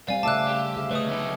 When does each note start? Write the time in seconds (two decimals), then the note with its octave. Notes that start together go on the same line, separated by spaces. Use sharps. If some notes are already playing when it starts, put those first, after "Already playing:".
0.08 G3 C4 D5 F5 G#5
0.23 C#3 A3 D5 E5 G5 A5 F#6
0.48 G4
0.76 D3 G#4 F5
0.91 A3 B4 C#5 D#5 D#6
1.09 B3 D#4